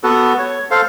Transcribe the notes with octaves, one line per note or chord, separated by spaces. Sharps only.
B3 F#4 A4
C#5
A4 C5 F5